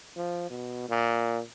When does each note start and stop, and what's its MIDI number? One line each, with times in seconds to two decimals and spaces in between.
0.17 0.50 53
0.50 0.85 47
0.89 1.41 46